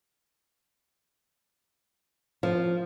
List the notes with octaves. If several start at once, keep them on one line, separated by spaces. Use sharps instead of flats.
F3